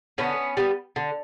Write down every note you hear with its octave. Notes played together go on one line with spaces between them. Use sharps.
D3 B3 C#4
G3 B3
D3